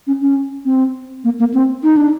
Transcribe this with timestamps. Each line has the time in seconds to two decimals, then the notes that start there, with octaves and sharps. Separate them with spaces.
0.07 C#4
0.22 C#4
0.66 C4
1.24 A#3
1.39 A#3
1.54 C4
1.83 D#4
1.97 D4